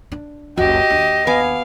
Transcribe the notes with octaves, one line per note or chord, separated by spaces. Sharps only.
D4
F#1 C#2 F#4 G4 D#5
D#2 D4
B3 F5 G#5 D6